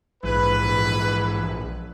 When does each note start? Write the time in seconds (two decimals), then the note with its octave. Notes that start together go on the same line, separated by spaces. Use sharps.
0.23 A#1 G#2 E3 B4